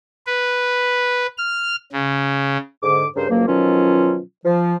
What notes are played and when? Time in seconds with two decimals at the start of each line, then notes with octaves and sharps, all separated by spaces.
0.27 B4
1.38 F6
1.92 C#3
2.83 G#2 D3 D6
3.16 G2 C#3 A#4 C5
3.30 C#2 F#2 F3 F#3 A#3
3.47 B2 D#3 F3 F#3 C#4 F4
4.45 F3